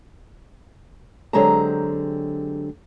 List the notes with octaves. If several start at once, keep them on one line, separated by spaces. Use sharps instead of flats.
D3 F#3 G#3 C4 G4 A#5